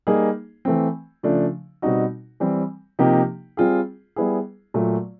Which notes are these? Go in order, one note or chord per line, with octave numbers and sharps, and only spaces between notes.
G3 A#3 D#4 G#4
E3 A3 C4
C#3 F3 A3 D4
B2 G3 C4 D#4 F#4
E3 G3 C4
C3 F3 A#3 D#4 G4
G3 C4 F4 G#4
G3 B3 E4 G#4
A#2 F#3 A3